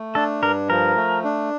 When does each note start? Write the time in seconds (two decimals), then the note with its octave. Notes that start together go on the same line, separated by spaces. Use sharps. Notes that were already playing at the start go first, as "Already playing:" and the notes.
Already playing: A3
0.15 D4 A4
0.43 G2 A#4
0.70 F3 A#4
0.97 A3
1.24 D4